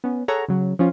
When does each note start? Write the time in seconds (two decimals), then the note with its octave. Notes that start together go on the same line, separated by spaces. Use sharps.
0.04 B3 C#4
0.28 G#4 A4 C#5 F#5 A#5
0.48 C#3 F#3
0.79 F3 C#4 F4